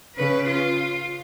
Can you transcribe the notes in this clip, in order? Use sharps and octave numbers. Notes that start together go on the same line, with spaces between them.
C#3 B4
F4